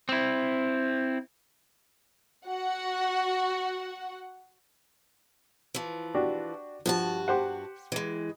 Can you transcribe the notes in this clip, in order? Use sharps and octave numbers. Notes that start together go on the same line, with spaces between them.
C4 E4
F#4 F#5
E3 F3
D4 F#4 G4
G2 F3 F#4 A5
G4 C5 F#5
E3 G#3